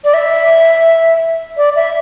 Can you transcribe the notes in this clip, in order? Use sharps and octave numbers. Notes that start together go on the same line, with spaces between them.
D5
E5
D5
E5